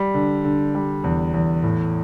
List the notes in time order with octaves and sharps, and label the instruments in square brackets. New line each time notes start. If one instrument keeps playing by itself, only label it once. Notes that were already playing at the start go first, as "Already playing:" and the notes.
Already playing: [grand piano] G3
D3
D3
G3
E2
E2
A2